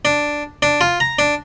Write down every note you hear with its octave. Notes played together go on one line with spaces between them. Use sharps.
D4
D4
F4
A#5
D4